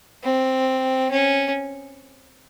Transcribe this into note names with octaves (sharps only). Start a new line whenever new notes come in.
C4
C#4